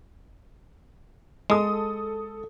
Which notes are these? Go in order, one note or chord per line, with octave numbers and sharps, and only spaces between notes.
G#3 A4 D#6